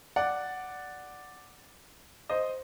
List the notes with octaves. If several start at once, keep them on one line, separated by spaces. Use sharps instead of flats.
D5 F#5
C5 D#5